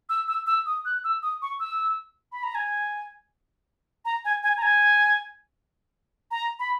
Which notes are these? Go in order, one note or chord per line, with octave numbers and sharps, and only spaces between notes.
E6
E6
E6
D#6
F#6
E6
D#6
C#6
E6
B5
A#5
G#5
A#5
G#5
G#5
A#5
G#5
A#5
B5